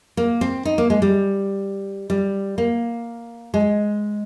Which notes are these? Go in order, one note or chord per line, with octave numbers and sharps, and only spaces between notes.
A#3
C4
D#4
A#3
G#3
G3
G3
A#3
G#3